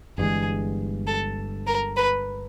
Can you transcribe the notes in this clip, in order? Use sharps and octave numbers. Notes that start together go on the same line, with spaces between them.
G1 G2 E3 G#3 G#4
A4
A#4
B4